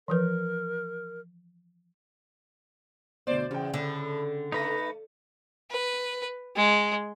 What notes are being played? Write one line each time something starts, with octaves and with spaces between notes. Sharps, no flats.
E3 F3 A#4 B4
D2 B2 C5 D5
E2 C#3 G5
A2 D3
A3 D#4 B4 A#5
B4
G#3